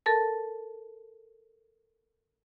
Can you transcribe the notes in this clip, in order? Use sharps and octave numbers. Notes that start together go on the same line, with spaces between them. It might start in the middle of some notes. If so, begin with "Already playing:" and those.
A4 A#4 A5